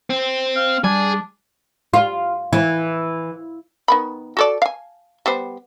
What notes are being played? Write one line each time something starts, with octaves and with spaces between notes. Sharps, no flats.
C4
F5
G3 D4 G#4
F4
E3
D#3 B3 B5
F#4 A4 D5
F5 G#5
G3 B3 C5